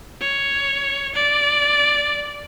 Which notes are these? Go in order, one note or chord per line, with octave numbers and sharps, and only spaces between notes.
C#5
D5